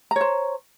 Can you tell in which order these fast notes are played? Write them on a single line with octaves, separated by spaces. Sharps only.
A#5 C#5 C5